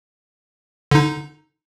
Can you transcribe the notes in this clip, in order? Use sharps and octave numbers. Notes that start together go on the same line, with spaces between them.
D3 D#4